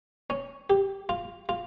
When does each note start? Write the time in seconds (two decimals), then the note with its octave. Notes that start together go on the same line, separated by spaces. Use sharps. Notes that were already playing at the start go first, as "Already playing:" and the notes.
0.30 C#4
0.70 G4
1.09 F4
1.49 F4